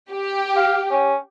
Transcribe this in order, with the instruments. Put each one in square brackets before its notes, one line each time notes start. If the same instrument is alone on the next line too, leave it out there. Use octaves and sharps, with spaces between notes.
[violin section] G4
[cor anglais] F5
C#4